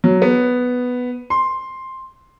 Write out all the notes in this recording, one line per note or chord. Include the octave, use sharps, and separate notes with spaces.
F#3
B3
C6